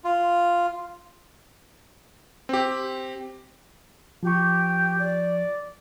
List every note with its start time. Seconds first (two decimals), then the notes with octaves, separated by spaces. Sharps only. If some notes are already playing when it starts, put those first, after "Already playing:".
0.04 F4
2.49 C4 G4
4.23 F3 G4 C#6
4.99 D5